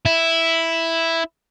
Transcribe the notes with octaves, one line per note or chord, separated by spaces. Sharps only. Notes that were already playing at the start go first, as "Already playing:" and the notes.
E4